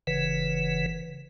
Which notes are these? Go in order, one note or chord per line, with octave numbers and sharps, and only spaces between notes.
F#1 C#3 E3 B4